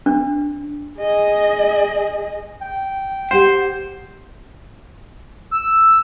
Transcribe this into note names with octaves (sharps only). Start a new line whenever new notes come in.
D4
G#4 D#5
G5
G4 C5 F#5
E6